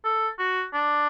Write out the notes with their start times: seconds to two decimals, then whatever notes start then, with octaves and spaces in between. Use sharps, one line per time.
0.04 A4
0.39 F#4
0.74 D4